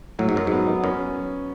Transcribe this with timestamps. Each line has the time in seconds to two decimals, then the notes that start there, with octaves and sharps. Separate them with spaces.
0.19 A2 F#3
0.29 G#2
0.36 F#2 F#3
0.47 G#2 B3
0.68 B3
0.83 F#2 C#4